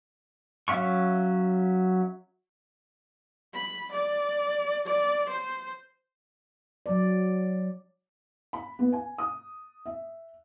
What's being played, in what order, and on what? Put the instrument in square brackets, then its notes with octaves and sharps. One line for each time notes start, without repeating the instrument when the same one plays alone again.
[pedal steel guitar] F#3 C#4 E5 F5 C#6
[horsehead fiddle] B5
D5
D5
C5
[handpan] F#3 D5
[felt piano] B5
B3
G#5
D#6
E5